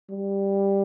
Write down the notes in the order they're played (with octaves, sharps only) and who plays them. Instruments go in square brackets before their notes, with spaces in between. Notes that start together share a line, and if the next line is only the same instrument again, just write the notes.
[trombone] G3